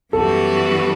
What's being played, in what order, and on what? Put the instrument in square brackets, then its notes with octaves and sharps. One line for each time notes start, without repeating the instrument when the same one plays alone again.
[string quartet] F#2 E3 G3 B3 F#4 [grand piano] A4